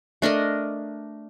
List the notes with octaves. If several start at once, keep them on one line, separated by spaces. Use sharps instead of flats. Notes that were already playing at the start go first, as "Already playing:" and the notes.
A3 D4 A#4 D#5